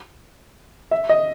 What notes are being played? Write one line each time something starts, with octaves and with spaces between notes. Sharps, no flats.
E5
D#5